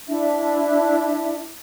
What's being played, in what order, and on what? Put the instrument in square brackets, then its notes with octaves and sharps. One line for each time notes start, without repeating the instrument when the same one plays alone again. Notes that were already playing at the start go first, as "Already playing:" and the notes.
[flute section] D4 E4 E5